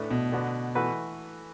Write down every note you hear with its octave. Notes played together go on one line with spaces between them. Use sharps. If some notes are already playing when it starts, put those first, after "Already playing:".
Already playing: A2 A3 D4 B4
B2
D3 B3 F#4
E3 A3 F#4 B4